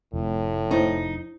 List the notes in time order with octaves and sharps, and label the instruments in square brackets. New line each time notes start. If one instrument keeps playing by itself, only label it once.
[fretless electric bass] F1 [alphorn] A2
[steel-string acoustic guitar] D#4 [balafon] E4 C5